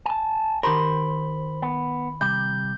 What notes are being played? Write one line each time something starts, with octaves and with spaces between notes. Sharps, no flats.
G#5 A5
D#3 G4 A#4 C5 B5
B3
C3 G3 G6